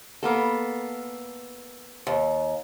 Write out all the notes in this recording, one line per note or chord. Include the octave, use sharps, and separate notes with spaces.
A#3 B3 A4
D#2